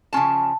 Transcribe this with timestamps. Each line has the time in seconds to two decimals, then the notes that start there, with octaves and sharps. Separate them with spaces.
0.13 C#3 F3 C#4 F4 A5